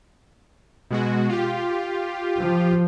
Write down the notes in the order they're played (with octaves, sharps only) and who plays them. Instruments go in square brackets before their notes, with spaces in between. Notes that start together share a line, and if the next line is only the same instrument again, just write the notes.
[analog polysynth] B2 G#3 F#4
F4 G4
[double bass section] F3